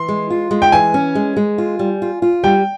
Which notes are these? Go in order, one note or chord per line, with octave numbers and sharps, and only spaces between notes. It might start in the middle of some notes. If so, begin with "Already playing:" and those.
Already playing: E3 C6
G#3
F4
G#3
G5
E3 G#5
C#4
G#3
G#3
F4
G3
F4
F4
G3 G5